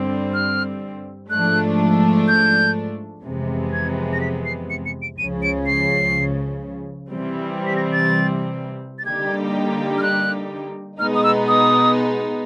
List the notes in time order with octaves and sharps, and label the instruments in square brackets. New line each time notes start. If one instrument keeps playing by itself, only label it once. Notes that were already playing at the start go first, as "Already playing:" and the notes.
Already playing: [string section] G2 D3 G3 C4
[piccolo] F6
[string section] G#2 F3 A3 D4 [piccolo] F#6
[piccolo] G6
[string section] F2 C3 E3 G#3 B3
[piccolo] G#6
A#6
B6
C7
C#7
C#7
D7
[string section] C#2 C#3 F3 [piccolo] D#7
[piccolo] D7
C7
[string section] C3 E3 G3 C4
[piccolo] B6
A#6
A6
A6
[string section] D3 G3 A#3 D#4 G4 [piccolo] G#6
[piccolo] F6
F#6
[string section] B2 G#3 B3 D#4 [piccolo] F6
[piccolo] D#6
E6
D#6